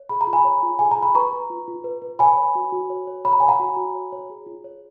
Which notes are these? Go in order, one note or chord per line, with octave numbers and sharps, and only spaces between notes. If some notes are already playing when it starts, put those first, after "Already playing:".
Already playing: C#5
G#4 B5
A#5
F4
G#5 B5
C#5
F4
G#4 G#5
A#5
F4
B5
B4 A#5 C#6
B4
F4
F4
B4
B4
C#5 G#5 B5
C#5
F#4
F#4
C#5
C#5
C#5 B5
A#5
C#5 G#5
F#5 A#5
F#4
F#4
C#5
C#5
G#4
F4
C#5